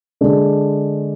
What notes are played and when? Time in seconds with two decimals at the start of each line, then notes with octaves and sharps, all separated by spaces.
0.21 D3 G#3 D4